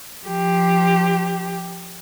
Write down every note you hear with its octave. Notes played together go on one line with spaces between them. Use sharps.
F3 G4